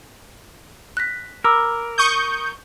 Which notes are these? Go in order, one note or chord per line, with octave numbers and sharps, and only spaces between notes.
F#6 A#6 B6
A#4 B5 D6 E6
C#6 D#6 G6